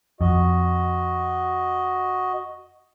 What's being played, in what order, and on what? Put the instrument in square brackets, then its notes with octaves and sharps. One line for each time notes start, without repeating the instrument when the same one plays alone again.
[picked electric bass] F2 [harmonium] F#4 D#5